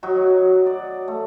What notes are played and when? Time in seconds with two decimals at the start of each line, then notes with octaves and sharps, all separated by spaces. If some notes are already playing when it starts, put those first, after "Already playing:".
0.03 F#3 D#4 F#4
0.66 D5
1.08 A3